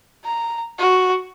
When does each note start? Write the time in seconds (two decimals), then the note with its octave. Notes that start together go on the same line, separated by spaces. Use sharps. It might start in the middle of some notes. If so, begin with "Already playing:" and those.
0.24 A#5
0.78 F#4